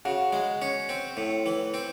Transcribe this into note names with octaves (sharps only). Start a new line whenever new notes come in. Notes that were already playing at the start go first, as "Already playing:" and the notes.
C#3 F#4
G#3
C#4
C4
A2
E3
C4